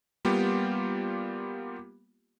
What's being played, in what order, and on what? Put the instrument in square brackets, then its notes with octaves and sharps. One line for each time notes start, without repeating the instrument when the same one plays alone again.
[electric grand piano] G3 A#3 B3 F4 G4